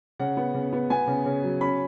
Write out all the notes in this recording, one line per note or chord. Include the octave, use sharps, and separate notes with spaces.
C#3 F#5
B3
C#3
B3
B3 G#5
C#3
C#3
F#3
C#4 B5